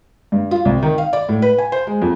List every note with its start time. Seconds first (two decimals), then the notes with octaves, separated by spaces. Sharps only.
0.32 G2
0.51 F4
0.65 C2
0.83 D#3
0.98 F5
1.13 D5
1.29 A2
1.42 B4
1.58 G#5
1.72 C5
1.87 G#3
2.02 F2